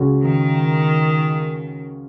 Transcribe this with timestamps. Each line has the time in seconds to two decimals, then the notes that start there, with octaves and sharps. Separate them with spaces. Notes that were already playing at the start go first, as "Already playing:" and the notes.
Already playing: C#2 C#3 G#3 C#4 F#4
0.22 D#3